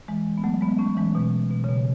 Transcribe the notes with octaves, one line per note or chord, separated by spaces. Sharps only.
E3 G#3
B3
F#3 A3
G#3 B3
A3 C#4
E3 G#3
B2
B2
C#3
B2